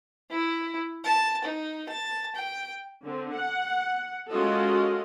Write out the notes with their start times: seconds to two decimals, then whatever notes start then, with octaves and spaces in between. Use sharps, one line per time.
0.30 E4
1.04 A5
1.44 D#4
1.89 A5
2.35 G5
3.03 D3 C4
3.35 F#5
4.29 G#3 C#4 F4 F#4 A4 D#5